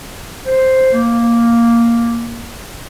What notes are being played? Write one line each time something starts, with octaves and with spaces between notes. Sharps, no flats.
C5
A#3